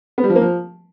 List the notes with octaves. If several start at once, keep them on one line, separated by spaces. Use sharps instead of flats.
B3
G3
F3
A#3
F3